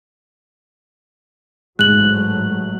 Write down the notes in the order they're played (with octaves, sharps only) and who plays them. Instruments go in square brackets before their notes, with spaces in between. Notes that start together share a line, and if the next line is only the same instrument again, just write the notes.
[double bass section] A1 F#3 A3 [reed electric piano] G#2 G#3 [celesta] F#6 F#7